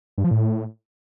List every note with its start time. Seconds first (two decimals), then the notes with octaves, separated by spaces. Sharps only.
0.18 G2
0.24 F3
0.31 A2